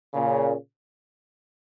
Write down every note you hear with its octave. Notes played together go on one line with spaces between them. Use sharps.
A#2 C#3